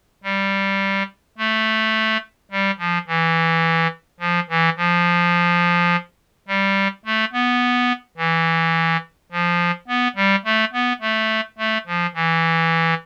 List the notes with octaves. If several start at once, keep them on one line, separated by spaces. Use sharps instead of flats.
G3
A3
G3
F3
E3
F3
E3
F3
G3
A3
B3
E3
F3
B3
G3
A3
B3
A3
A3
F3
E3